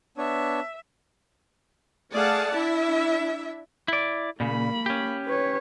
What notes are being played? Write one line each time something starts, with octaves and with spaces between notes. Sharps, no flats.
B3 D4 C#5 E5
A3 G#4 D5 F5 F#5 A5
D4 E4 E5
E4 D5
A#2 C#3 A#3 B5
C#4 G4
B4 C#5